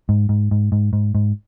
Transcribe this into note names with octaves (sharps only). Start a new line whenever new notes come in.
G#2
G#2
G#2
G#2
G#2
G#2